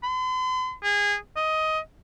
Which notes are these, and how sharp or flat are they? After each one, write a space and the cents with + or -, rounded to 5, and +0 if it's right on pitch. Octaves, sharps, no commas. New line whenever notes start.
C6 -45
G#4 -25
D#5 +15